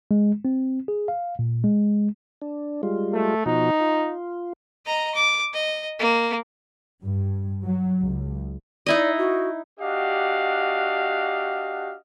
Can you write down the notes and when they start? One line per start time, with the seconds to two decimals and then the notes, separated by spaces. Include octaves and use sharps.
0.11 G#3
0.45 C4
0.88 G#4
1.08 F5
1.39 A#2
1.64 G#3
2.42 D4
2.83 G3 G#3 F4
3.13 A3
3.46 B2 F3 D#4 F#4
3.80 F4
4.86 D#5 A#5
5.15 D6
5.54 D#5
5.99 A#3
7.03 G2
7.64 F#3
8.02 C#2
8.86 D#4 E4 D5 D#5
9.18 F#4
9.80 D4 F#4 G4 D#5 F5 F#5